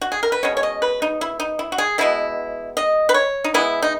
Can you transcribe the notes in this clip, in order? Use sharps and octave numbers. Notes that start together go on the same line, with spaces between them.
F#4
G#4
A#4
B4
B2 G#3 C#4 C#5
C#5
D#5
B4
D#4
E4
D#4
E4
F#4
G#4
B2 G#3 B3 E4
D#5
B4
C#5
D#4
E3 G#3 B3 E4
D#4